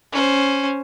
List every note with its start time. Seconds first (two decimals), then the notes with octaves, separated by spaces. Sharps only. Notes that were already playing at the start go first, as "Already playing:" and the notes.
0.13 C#4 C5